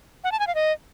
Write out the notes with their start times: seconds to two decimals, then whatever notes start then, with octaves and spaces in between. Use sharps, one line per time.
0.24 F#5
0.32 A5
0.39 G#5
0.47 F5
0.55 D#5